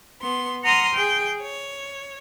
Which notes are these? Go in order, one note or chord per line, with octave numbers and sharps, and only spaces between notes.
B3 C6
F#5 A#5 C6 D#6 F6
G#4 G5
C#5